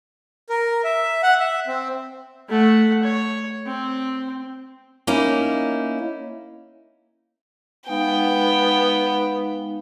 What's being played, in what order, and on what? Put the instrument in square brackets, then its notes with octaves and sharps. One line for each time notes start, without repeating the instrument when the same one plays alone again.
[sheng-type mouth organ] A#4
E5
F#5
E5
C4
[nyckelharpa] A3 F#5
C#5
C4
[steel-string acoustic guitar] A#3 C#4 D#4 E4
[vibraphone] G#3 D#4 F5 [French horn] B3 [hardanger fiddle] G5